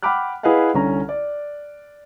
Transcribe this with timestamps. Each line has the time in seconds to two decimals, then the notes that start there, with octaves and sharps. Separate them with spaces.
0.03 F#5 G5 B5 D6 F6 F#6
0.43 E4 G#4 B4 D#5 F5 F#5
0.74 C2 D3 C#4 A#5
1.09 D5